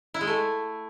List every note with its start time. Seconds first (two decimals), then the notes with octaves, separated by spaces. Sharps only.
0.14 E4
0.21 G#3
0.27 A3